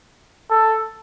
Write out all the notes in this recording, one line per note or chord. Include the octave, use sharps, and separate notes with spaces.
A4